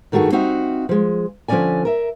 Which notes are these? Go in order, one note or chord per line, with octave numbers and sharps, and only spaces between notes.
G2 D#3 A3 F#4 G#4
C4 D#4 F#4 E5 F5
F3 G#3
D3 F3 F#3 C#4 D5 G#5
A#4 E5